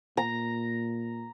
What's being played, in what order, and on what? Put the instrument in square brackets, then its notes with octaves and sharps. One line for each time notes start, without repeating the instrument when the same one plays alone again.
[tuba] A#2 [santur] A#5